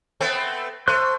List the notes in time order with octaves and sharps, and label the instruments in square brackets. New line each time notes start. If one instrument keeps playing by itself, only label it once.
[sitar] A3 B3 C4
[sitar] A3 [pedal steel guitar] C5 F#6